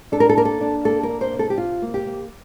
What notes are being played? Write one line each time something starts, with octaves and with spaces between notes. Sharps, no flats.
D4 A4
A#4
A4
A#3 A#4
A4
D4
A#3 A4
A#4
D4
C5
C3
A4
G4
C3 F4
A#3
G4
A#3